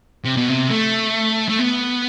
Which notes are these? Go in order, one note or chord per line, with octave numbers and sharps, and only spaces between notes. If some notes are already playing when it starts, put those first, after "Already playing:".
C3
B2
C3
A3
A3
B3